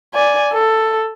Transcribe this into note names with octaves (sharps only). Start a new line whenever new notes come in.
D5 G#5
A4